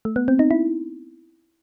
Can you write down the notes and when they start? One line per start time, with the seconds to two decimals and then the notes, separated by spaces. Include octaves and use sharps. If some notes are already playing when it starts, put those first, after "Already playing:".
0.05 A3
0.16 B3
0.28 C4
0.39 D#4
0.51 E4